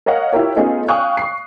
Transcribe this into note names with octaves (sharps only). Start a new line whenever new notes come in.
A#4 C#5 D#5 F5 F#5
E4 F4 G4 A#4 C#5
A3 B3 C#4 D#4 F4 G#4
F5 G5 G#5 C#6 D#6 F#6
C#6 C7